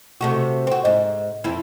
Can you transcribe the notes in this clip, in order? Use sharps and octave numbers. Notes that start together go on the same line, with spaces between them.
C3 A3 F#4
C4 F#4
G#2
F2 E4